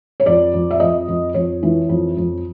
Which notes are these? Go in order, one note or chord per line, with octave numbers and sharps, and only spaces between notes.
C#5
F2 D5
F2
E5
F2 D#5
F2
F2 C#5
E3
F2
F2